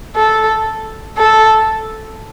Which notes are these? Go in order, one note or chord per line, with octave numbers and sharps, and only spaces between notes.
A4
A4